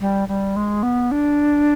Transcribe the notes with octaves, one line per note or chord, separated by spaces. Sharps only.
G3
G3
G#3
B3
D4